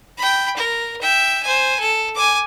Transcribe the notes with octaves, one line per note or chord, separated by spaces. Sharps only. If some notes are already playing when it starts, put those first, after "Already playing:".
G5 B5
A#4
E5 G5
C5 G#5
A4
G#5 D6